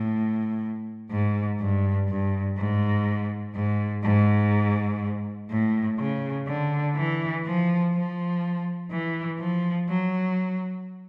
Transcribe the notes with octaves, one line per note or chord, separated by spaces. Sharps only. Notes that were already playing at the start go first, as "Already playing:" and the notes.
Already playing: A2
G#2
G2
G2
G#2
G#2
G#2
A2
C#3
D3
E3
F3
F3
E3
F3
F#3